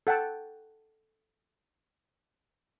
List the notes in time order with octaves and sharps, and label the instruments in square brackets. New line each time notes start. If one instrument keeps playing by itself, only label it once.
[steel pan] A4 F#5 G5 A5